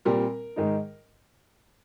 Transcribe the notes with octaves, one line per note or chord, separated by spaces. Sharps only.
A#2 G3 C4 A#4
G#2 D#3 G#3 D#4